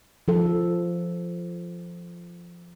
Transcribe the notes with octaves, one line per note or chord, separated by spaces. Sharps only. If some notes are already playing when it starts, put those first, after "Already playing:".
F3 A4